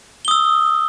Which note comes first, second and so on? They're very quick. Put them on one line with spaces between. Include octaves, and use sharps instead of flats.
G7 D#6 E6